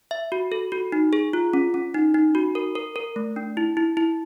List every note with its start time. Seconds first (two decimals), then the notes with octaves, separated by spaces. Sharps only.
0.11 E5
0.32 F#4
0.52 A4
0.72 F#4
0.92 D#4
1.13 G#4
1.33 F4
1.53 C#4
1.74 C#4
1.94 D#4
2.14 D#4
2.35 F#4
2.55 A#4
2.75 A#4
2.96 A#4
3.16 A3
3.36 D4
3.57 E4
3.77 E4
3.97 E4